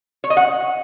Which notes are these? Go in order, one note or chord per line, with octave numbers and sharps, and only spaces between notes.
C#5
D#5
F#5